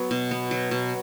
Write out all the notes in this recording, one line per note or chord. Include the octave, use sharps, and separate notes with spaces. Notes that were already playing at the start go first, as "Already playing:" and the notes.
Already playing: F#3 B3
B2
B3
F#3
B2